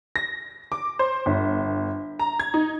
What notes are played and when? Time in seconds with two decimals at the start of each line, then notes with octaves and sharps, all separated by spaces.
0.16 A#6
0.72 D6
0.99 C5
1.26 G1
2.19 A#5
2.39 G#6
2.54 D#4